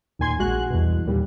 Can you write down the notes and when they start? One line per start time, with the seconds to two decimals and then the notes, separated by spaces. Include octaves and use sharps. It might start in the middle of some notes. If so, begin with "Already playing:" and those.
0.19 D#2 A#2 G#5 C6 G#6
0.39 A#1 G#3 F#4 F#6
0.70 E2 G2 B2
1.06 D#2 A#2 G3